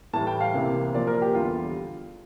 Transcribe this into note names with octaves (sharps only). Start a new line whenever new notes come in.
A2 E3 G3 A5
G5
F5
C2 C3 E3 A#3
A#2 F3 A#3 D5
A#4
G4
E2 D3 G3 F4